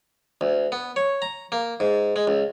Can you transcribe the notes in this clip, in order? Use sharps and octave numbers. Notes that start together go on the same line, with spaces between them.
D2
B3
C#5
A#5
A#3
G#2
G#3
C#2